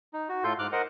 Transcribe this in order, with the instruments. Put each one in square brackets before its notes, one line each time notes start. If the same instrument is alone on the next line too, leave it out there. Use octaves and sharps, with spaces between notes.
[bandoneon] D#4
F#4
A2 F4 A4 C6 G6
G#2 D6 F6 F#6
A#4 C5 D#5 F#5